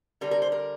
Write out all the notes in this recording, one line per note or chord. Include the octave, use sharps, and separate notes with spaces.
D3 G3 A#4
A#4
C5
A#4